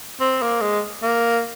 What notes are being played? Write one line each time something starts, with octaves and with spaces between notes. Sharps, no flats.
C4
A#3
G#3
A#3